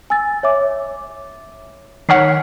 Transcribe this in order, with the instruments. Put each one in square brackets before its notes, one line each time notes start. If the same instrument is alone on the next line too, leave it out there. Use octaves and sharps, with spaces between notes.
[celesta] G#5 E6 A6
C#5 E5 D6
[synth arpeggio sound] D#3 C#5 F#5 [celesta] F6 B6 C7